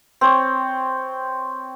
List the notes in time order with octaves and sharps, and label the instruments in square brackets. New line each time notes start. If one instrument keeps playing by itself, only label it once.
[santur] C4 C#5